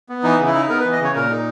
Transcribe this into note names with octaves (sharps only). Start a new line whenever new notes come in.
B3
E3 D#4
C#3
E4
D#4
B3 A#4
B4
E3
D#5
C#3 C#5
A#2 A#4
D#4